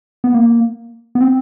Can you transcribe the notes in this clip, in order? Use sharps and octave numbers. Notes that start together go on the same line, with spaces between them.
B3
A#3
B3
C4